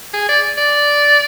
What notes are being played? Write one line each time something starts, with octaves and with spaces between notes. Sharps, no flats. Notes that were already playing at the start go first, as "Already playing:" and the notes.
G#4
D5
D5